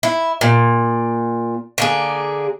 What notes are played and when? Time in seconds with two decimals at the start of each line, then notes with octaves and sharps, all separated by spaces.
0.03 E4
0.41 A#2
1.78 D3 A#3 G#4